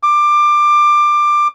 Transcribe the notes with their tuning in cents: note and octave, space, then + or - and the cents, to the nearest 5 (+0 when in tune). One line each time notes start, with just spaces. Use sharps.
D6 +20